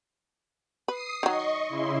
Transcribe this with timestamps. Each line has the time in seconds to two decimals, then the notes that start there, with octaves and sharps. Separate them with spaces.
0.88 B4 D#6 C7
1.23 D#3 F#3 D#5 C#6
1.66 C#3 E4 C6